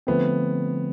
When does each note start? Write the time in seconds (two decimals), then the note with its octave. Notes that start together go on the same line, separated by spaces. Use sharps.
0.07 D3 F3 A3 B3 C4